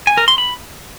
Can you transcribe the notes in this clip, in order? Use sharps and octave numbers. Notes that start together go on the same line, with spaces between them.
G#5
A#4
C6
B5